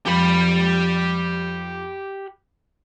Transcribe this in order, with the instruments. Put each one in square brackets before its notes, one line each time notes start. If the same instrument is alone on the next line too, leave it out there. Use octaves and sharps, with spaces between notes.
[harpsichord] F2 [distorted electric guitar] G4 B5